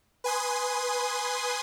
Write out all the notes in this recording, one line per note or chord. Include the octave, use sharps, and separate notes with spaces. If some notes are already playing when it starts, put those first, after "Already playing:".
B4 G#5 C6 D#6